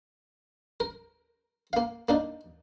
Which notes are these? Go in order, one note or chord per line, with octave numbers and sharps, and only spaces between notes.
A#4
A#3 F5
A#3 D4 D#4